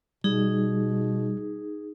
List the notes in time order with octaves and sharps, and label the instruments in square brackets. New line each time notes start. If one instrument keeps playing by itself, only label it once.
[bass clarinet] B2 [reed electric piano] G3 [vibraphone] D#4 G#4